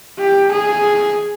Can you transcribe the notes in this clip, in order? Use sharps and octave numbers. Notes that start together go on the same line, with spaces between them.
G4
G#4